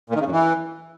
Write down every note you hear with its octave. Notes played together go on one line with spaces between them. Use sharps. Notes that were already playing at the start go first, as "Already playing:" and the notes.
A#2
D#3
C#3
F#2
E3